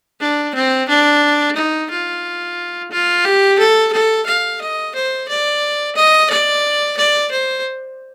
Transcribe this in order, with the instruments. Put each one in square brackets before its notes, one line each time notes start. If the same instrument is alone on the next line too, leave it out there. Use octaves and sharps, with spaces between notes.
[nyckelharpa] D4
C4
D4
D#4
F4
F4
G4
A4
A4
F5
D#5
C5
D5
D#5
D5
D5
C5